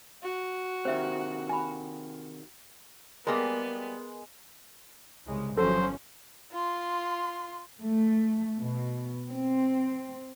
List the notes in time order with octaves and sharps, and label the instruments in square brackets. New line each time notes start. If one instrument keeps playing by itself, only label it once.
[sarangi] F#4
[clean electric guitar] C3 D#3 [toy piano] C5 E5
[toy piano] G#5 B5
[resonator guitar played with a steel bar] G3 A#3 G4 [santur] G#3 [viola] B3 [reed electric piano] A#4
[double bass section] C2 C#3 G#3
[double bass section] G1 F3 C#4 [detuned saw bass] F#3 [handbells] A4 [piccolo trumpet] C5
[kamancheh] F4 C6
[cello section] A3
B2
C4